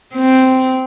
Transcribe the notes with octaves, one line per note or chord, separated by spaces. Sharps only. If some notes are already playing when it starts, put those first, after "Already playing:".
C4